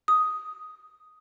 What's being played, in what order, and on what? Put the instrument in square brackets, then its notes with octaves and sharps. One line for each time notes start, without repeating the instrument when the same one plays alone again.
[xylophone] D#6